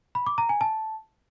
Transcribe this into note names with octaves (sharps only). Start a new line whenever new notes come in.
B5
D6
A#5
G#5
A5